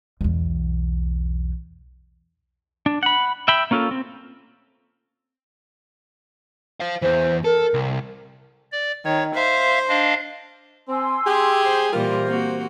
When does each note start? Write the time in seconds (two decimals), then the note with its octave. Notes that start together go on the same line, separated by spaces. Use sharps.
0.21 B1 E2
2.86 D4
3.03 F#5 B5
3.48 E5 G5 B5
3.71 A#3 C#4 F4 A4
3.91 C4
6.80 C5 F5
7.02 E2 E3 C5
7.44 A4 A#4
7.74 C2
8.72 D5
9.05 D#3 C#5
9.35 C5 E5 F5
9.89 D4 D#5 F5
10.88 C4 G#5 C6 E6
11.27 G4 G#4
11.63 C5
11.93 A#2 E3 G3 F4 A#4 C5
12.26 A#3 C4 F#4